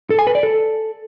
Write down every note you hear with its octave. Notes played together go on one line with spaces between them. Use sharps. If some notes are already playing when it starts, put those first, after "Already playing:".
A4
G#5
B4
D5
A4